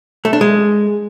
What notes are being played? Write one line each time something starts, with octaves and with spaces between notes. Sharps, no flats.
A3
D4
G#3